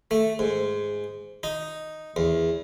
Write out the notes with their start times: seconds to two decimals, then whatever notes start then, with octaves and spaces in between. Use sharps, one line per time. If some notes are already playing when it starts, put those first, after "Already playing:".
0.11 A3
0.39 G#2
1.43 D#4
2.16 E2